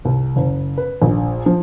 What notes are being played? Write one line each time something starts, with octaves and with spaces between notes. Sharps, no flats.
C2
F#1
B4
A#1
F3